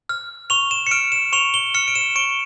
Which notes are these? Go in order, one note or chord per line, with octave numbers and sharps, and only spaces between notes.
F6
C#6 F7
E7
C#7
F6 D7
E7
C#6 F7
G7
F6 C#7
D7
E7
C#6 D7